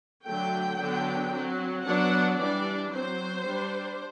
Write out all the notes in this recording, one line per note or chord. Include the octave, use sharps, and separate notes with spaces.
D3 F#3 A3 G5
D3 F#3 B3 D4
F#3 C4
F#3 B3 D4 F#5
E3 G3 D4 D5
F#3 C4 C5
G3 D4